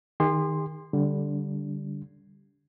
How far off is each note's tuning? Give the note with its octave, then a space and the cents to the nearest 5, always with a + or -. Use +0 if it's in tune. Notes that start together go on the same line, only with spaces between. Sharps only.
D#3 +0 G#4 -45 C6 +0
D3 -15 G3 +0 D4 -30